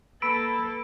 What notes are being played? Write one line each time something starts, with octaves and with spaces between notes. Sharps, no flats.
A#3 A4 B4 B5 E6 D7